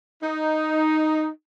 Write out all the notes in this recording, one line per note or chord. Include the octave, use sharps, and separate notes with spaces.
D#4